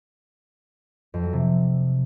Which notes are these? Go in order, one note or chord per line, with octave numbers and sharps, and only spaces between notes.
F2
F#3
C3